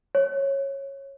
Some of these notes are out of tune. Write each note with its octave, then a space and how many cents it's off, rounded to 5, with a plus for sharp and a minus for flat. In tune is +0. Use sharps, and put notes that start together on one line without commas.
C#5 -15